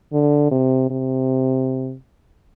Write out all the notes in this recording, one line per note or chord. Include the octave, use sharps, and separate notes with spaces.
D3
C3
C3